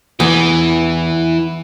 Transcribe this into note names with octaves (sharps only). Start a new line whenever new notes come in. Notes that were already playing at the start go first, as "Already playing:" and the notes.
E2 E3